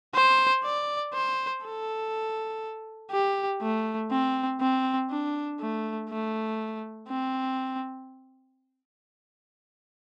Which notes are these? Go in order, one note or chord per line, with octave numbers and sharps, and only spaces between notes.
C5
D5
C5
A4
G4
A3
C4
C4
D4
A3
A3
C4